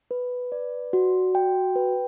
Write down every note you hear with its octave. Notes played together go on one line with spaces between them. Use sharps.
B4
D5
F#4
G5
B4